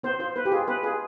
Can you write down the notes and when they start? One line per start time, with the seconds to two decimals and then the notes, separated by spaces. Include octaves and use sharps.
0.03 B3 C5
0.19 F4 C5
0.36 B3 B4
0.45 G4
0.52 F4 G#4
0.68 B3 B4
0.83 F4 G#4